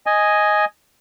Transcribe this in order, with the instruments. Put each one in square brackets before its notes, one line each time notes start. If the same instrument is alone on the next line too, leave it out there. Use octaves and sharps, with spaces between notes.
[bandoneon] D#5 G#5